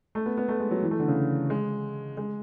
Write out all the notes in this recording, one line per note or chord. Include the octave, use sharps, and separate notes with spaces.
A3
B3
B3
A3
G#3
F#3
E3
A3
D3
C#3
G#3
G#3